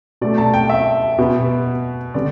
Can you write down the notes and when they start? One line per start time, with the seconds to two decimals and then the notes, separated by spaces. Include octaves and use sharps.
0.21 B2 A3 D5
0.38 A5
0.54 G5
0.69 E5
1.18 B2 B3
2.14 D3 G3 B3 D5